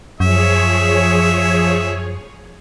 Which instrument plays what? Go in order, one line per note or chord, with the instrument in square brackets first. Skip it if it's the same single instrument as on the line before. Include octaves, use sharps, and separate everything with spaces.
[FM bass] F#2 [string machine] F3 G#4 C#5 [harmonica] E5